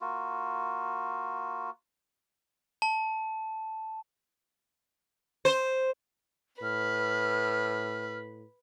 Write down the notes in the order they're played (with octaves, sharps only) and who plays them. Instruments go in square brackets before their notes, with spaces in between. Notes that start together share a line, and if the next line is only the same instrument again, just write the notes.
[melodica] A#3 F4 F#4
[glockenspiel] A5
[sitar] C5
[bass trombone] A2 [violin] B4 [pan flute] F6